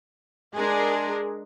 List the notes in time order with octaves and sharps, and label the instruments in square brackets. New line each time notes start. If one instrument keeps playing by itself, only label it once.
[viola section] G#3 D4 [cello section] G#4 A#4